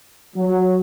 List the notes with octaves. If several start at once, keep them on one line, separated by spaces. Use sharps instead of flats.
F#3